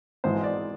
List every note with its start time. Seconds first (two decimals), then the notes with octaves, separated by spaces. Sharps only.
0.24 G#1 G#2 E3 C5
0.43 D5